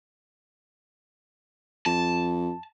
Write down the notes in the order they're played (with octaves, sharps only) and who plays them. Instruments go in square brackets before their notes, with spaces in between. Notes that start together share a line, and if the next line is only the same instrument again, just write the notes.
[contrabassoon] F2 [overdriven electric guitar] A5